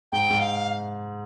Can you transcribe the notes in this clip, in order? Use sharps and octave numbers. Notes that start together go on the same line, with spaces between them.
G#2 G5
G#2
F5